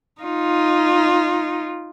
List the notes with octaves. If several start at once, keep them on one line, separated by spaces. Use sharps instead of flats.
D#4 F4